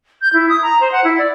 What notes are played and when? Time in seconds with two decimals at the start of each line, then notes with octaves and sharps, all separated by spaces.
0.21 G6
0.33 E4
0.49 D#6
0.62 A#5
0.80 C5
0.92 F#5
1.04 E4
1.18 D5